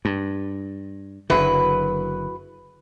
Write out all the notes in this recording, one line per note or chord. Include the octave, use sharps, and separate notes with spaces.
G2
F#1 D3 F#3 E4 B4